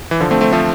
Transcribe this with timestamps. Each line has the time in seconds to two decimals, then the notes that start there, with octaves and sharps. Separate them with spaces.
0.11 E3
0.20 D3 F3
0.31 A3 C4
0.41 A3 C4
0.52 F3 A3